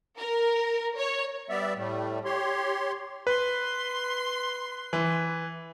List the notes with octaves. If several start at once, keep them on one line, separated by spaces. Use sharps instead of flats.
A#4
C#5
G3 B3 D5 E5
A2 G3 A3
G4 C#5 C6
B4 C6
E3